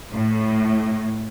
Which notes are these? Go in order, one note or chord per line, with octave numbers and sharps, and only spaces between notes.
A2